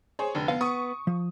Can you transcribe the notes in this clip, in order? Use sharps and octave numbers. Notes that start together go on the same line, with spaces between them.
G#4 C5 C#5
F1 D3
B3 F5
B3 C#6 D#6
F3